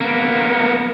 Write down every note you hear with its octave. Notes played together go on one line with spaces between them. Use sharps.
A#3 B3